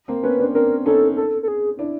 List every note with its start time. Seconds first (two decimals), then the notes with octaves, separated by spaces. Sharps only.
0.08 A#3 C4
0.23 B3 C#4 B4
0.39 C4 D4
0.54 C4 D4 A#4
0.86 C#4 D#4 A4
1.16 A4
1.43 A4
1.48 G#4
1.79 D4 E4